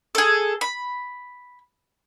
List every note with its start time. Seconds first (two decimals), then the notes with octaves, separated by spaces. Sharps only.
0.15 G#4 A4
0.61 B5